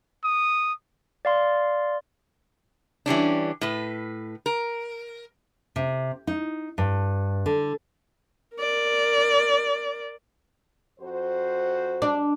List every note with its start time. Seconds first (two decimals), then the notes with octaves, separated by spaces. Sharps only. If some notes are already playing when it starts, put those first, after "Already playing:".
0.24 D#6
1.25 D5 F5 C6
3.06 E3 G3 C#4 D4
3.61 A2 B4
4.46 A#4
5.76 C3
6.27 D#4
6.78 G2
7.46 D3
8.56 A#4 D5
11.00 F2 F#4 C5
12.02 D4